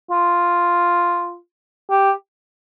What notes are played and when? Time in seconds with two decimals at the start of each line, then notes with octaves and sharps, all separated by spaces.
0.11 F4
1.91 G4